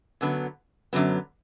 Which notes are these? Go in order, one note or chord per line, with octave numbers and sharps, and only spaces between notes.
F#2 D3 F#3 B3
F#2 D3 F#3 B3